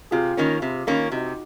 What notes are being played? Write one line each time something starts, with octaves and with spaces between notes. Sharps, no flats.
C3 F4 G#4
D#3 A#3 C#4
C3
D#3 A#3 C#4
C3 D#4 F#4